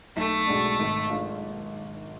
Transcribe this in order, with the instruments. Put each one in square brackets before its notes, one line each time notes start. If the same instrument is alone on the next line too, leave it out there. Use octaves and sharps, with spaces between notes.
[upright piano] B1 [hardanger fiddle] A3
[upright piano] B2 G#3 D4
G#1
G#3 D4 F4